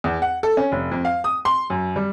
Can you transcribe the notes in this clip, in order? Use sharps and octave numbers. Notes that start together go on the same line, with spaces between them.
E2
F#5
A4
C#4
F1
F2
F5
D#6
C6
F#2
G3